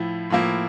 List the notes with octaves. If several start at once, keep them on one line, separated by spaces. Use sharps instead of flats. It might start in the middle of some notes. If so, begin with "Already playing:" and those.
Already playing: A2 F3 E4
A2 F3 A#3 E4